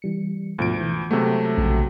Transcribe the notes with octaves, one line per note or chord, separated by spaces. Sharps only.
E3 G3 C#7
D2 G#2 B2 F3 D7
E3 G6
C3 F#3 G#3 A3 B3
A#1 C#3 F#4